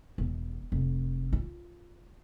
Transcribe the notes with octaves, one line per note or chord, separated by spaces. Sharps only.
E1
F1
F4